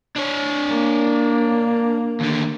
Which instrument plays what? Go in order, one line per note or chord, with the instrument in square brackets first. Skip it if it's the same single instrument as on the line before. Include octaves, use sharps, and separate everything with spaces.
[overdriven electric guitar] D4 C#5
[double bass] A#3
[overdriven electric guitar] D#2 D3